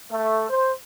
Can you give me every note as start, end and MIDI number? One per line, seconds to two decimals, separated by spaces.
0.12 0.48 57
0.50 0.72 72